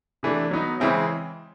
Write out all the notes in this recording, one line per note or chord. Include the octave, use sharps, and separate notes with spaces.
C3 E3 A3 D4
F#3 B3 D#4
C#3 E3 G#3 C4 E4